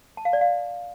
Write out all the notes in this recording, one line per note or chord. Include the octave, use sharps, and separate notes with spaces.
A5
F5
D5
F5